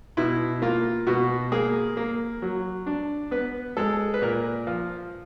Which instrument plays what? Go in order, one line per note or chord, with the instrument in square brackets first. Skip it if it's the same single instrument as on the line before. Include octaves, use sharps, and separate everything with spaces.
[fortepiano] B2 E4
A#3 F4
B2 F#4
A#3 G#4
A#3
F#3
D4
B3 B4
G#3 A4
B4
A#2 A#4
F3